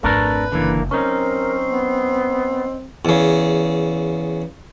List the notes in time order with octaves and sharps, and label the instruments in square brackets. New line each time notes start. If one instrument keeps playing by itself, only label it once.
[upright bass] G#1 F2 [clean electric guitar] A3 D4 A#4 [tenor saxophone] B4
[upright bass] F#1 F2 [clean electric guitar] D3 E3 [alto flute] A#3
[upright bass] F#3 [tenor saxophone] C4 [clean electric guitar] C#4 D#4 [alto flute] A#4
[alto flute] B3
[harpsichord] E2 C#3